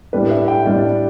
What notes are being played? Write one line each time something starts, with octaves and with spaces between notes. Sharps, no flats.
A2 G3 D4 B4
E5
G5
A2 G3 D4 D5